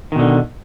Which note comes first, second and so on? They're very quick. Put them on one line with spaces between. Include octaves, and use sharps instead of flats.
D#3 B2 D3